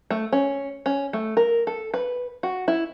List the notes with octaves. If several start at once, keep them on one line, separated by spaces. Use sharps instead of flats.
A3
C#4
C#4
A3
A#4
A4
B4
F#4
E4